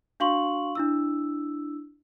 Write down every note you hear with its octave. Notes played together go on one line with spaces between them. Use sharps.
D4 F#4 F5 C6 C#6 F#7
D4 E4 E6